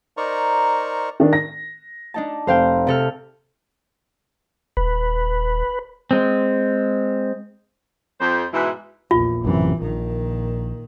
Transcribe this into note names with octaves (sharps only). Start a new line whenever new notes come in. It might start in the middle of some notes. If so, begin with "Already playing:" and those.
D#4 A#4 C5 D5 A#5 C#6
D#3 D4
A#6
D4 D#4 A5
F1 C5 F5 G5
C3 A4 F6
D#1 B4
G#3 C4
F2 C5
G#2 B2 E3
A#1 E2 F4
A1 F#2 C3 E3
A#1 A#2 D#3